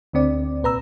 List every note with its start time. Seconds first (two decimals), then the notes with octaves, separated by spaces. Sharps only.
0.13 D2 D3 C4 D5
0.62 C2 A#2 B4 A#5 E6